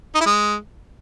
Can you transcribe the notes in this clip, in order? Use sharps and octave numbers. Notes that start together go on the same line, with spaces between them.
D#4
E4
G#3